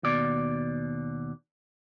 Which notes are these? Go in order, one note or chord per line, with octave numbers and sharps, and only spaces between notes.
D#2 B2 D5